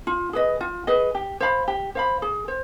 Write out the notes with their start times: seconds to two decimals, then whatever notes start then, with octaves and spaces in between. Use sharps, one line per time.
0.07 F4
0.33 G#4 B4 D#5
0.61 F4
0.87 G#4 B4 D#5
1.15 G4
1.40 C5 F5 B5
1.68 G4
1.95 C5 F5 B5
2.22 G#4
2.48 C5